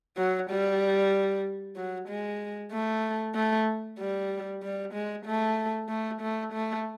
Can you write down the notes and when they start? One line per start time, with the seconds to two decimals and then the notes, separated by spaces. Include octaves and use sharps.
0.17 F#3
0.49 G3
1.76 F#3
2.08 G#3
2.72 A3
3.35 A3
3.99 G3
4.63 G3
4.93 G#3
5.25 A3
5.89 A3
6.21 A3
6.53 A3